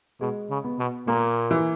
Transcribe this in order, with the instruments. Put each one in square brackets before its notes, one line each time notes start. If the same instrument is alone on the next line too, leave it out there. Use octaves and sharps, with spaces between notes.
[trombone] B2 [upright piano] G#3
[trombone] C#3
[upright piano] B3
[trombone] B2
[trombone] A#2 [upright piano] A#3
[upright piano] E3